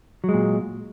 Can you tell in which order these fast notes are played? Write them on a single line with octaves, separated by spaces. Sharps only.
F#3 G#3 A#2